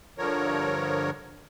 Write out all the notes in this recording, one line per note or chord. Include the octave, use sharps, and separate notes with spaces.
G2 D3 F3 A#4 C#5